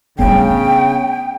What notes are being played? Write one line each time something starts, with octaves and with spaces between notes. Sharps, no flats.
C#3 G3 A3 B3 D4 G5